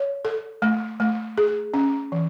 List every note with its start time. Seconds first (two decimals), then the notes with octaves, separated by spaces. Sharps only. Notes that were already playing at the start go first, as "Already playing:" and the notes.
Already playing: C#5
0.25 A4
0.62 A3
1.00 A3
1.38 G#4
1.74 C#4
2.12 E3